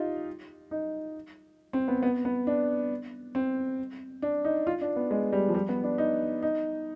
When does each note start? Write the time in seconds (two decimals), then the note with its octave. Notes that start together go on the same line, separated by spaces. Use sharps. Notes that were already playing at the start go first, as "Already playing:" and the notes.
Already playing: D#4 F4 G4
0.71 D#4
1.73 C4
1.88 B3
2.03 B3
2.25 B3
2.47 D4
3.35 C4
4.22 D4
4.45 D#4
4.67 F4
4.81 D4
4.96 B3
5.11 G#3
5.33 G3
5.48 F3
5.55 G3
5.69 B3
5.84 D4
5.98 D#4
6.43 D#4